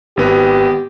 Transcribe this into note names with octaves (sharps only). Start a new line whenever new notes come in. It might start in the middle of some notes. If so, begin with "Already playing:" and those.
G#1 B3 G4